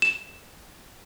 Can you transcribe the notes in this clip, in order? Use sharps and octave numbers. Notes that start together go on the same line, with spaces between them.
E7